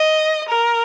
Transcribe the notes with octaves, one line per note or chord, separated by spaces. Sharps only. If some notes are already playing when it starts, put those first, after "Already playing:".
Already playing: D#5
A#4